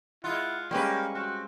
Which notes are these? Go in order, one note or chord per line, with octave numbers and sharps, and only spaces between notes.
G#3 E4 F4 F#5
G3 G#3 A#3 C#4 G4 B4 C#6
C4 F#4